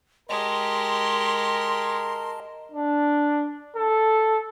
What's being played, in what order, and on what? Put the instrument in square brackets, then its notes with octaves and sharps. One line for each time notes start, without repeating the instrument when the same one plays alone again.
[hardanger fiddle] G#3 G4 [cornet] A#4 [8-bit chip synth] D#5 A5 [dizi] C6
[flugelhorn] D4
A4